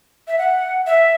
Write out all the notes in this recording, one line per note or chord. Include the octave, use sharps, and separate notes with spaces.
E5
F#5
E5